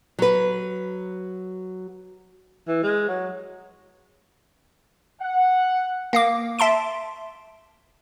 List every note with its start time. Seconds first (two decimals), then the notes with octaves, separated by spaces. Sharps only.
0.19 F#3 B4
2.68 E3
2.83 G#3
3.08 F#3
5.22 F#5
6.13 A#3 F5 D6
6.59 E5 A5 C6 D7